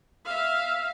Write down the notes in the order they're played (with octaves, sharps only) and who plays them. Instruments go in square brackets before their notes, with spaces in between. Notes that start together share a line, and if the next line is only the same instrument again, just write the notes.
[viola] E5 F5